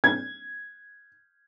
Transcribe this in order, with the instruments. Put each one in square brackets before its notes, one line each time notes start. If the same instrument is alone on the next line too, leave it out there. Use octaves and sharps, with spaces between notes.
[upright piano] G#6